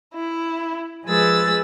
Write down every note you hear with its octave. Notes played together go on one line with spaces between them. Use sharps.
E4
F3 G#3 G#4 B4 E6 A6